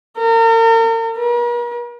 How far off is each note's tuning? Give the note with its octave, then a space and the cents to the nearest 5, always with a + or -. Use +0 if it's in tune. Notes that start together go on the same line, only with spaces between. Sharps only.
A#4 -40
A#4 +45